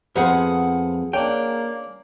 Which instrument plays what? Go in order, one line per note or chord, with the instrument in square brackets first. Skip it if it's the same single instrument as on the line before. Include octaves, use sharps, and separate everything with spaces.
[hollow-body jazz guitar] F2 [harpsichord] B3 C5 F5 [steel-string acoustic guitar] G#4 F#5
[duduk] A#3 [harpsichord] C#4 D4 [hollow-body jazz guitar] G5